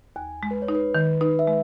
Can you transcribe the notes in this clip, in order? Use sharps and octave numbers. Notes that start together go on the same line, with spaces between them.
D#2 G#5
G#3
B4
C#5
D#4
B4
D#3
D#4 B4
E5
G#3